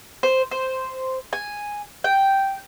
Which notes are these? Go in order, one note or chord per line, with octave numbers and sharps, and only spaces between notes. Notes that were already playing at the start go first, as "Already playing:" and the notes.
C5
C5
G#5
G5